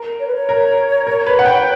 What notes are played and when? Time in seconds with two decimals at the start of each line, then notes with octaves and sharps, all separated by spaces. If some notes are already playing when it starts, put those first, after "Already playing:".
Already playing: A#4
0.19 C#5
0.27 B4
0.35 C#5
0.49 A#4
1.07 A#4
1.27 B4
1.39 F#5
1.46 G5